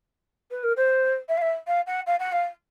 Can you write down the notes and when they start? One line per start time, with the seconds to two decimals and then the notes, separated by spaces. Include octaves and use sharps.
0.51 B4
0.63 A#4
0.76 C5
1.28 E5
1.37 F5
1.41 E5
1.67 F5
1.86 F#5
2.06 F5
2.19 F#5
2.32 F5